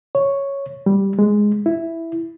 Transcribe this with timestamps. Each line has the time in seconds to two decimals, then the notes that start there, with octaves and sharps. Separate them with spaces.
0.15 C#5
0.86 G3
1.19 G#3
1.66 E4